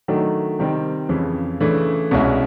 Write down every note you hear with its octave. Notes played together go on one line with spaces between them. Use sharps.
D#3 F#3 A3 D4
C3 D#3 G3 C4
F2 C#3 E3
C#3 E3 A3 D4
C2 B2 G#3 C#4 E4